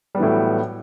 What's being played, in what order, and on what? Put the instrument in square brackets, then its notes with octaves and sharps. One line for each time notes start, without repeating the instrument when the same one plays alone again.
[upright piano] G3
B3
E3
A2
F#3